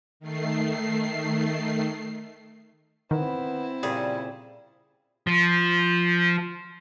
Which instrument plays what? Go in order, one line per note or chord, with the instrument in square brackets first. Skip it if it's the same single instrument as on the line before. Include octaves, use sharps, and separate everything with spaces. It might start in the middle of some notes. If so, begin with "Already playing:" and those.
[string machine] D#3 A3 C7
[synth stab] D#3 [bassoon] B3 [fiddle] C4 E4
[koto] A#2 C#3 G#4 [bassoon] G3
[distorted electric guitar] F3